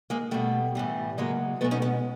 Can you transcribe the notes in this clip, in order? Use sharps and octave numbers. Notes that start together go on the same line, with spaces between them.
G#3 A#3
B2 G3 A3
A2 E3 G3
C#3 F#3 G#3 A#3
B2 G#3 A3 B3
C#4 D#4
B3 C#4